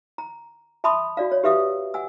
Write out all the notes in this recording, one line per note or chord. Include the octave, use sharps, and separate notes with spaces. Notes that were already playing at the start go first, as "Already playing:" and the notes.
A#5
E5 A5 B5 C6 D#6
F#4 D5 F5
C#5
G4 B4 E5 F5 D#6
F#5 G#5 E6